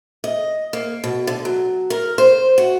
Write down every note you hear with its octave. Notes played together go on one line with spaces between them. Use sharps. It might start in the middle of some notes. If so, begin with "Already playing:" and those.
D#5
A#3
B2
D3
F#3
A#4
C5
F#4